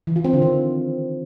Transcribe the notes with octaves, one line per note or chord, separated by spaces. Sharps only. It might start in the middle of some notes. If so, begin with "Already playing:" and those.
E3
F4
C4
D3
D#3